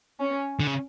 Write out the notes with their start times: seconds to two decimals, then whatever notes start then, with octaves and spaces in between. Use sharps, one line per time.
0.20 C#4
0.60 D3
0.67 C#3